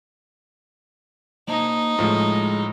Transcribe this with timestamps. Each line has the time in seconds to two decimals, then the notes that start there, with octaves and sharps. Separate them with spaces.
1.48 A#3 D#4 C5 A5
1.99 A2 F3 G#3 F4 G#4